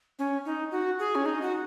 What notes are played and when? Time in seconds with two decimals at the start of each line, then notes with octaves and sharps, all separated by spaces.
0.19 C#4
0.45 D#4
0.72 F#4
0.99 G#4
1.15 C#4
1.25 D#4
1.42 F#4